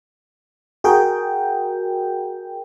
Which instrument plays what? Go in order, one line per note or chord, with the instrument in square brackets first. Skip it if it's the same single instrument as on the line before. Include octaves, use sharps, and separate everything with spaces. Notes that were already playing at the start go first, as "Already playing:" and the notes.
[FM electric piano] F#4 G#4 A#4 G5